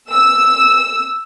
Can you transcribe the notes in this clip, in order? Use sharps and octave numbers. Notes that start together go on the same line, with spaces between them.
E6